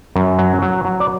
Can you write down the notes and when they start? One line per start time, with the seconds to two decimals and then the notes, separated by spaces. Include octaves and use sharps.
0.16 F#2
0.39 F#3
0.62 F#3
0.85 F#3
1.00 D5